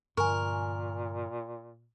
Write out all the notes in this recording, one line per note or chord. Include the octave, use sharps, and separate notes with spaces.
G2 A#2 D3 F3 A#4 G#5 C#6